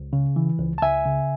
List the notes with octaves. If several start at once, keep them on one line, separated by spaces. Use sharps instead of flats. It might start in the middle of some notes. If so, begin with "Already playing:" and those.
Already playing: C#2
C#3
E3
C#2
A5
C#2 E5 G#5
C#3